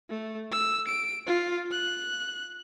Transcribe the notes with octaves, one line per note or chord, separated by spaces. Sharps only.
A3
E6
D7
F4
F#6